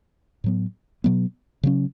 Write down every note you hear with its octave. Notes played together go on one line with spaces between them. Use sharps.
A2 F#3 B3
B2 F#3 B3
C#3 F#3 C#4